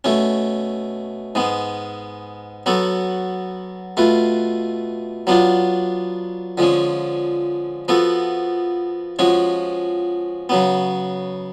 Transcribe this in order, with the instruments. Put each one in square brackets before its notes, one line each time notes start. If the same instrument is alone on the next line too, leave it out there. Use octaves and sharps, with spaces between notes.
[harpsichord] B2 A3 C#4
G#2 G#3 B3
F#3 B3 F#4 A4
B2 A3 F4 B4
F#3 B3 D4 F4
D3 F3 G#3 C#4
F3 B3 F#4 A4
F3 G#3 C#4 F#4
C#3 F#3 B3